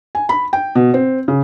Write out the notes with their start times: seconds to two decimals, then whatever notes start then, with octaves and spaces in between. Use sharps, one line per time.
0.15 G#5
0.29 B5
0.53 G5
0.75 B2
0.94 C4
1.28 C#3